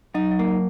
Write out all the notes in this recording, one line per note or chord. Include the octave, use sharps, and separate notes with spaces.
F#3 D#4
F#3
A#3
F#3